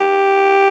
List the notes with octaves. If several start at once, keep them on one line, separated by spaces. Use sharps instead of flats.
G4